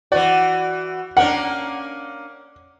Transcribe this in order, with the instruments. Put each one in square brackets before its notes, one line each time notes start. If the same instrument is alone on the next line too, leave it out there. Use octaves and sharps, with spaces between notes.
[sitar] E3 F#4 [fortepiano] D5
[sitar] A#3 C#4 D4 [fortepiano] F#5